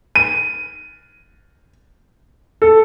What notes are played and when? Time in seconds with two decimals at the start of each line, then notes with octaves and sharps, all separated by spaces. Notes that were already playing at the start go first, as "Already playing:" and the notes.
0.15 D#7
2.62 A4